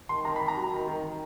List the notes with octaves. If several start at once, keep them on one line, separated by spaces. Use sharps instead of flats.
D#3 C6
D#3 A#5
B5
D#3
A#5
F#3
D#3
D#3
D#3